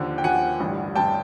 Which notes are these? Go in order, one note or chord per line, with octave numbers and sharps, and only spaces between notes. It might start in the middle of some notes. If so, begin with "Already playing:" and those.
Already playing: D#2 D3 F3
G5
D#2 D3 F3 F#5 G#5
A1 G2 D3
A1 G2 D3 G5 A5